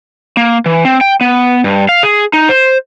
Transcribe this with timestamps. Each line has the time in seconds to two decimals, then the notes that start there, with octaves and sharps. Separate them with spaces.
0.37 A#3
0.66 E3
0.85 C4
1.01 G5
1.21 B3
1.64 G2
1.89 F5
2.03 G#4
2.33 D#4
2.49 C5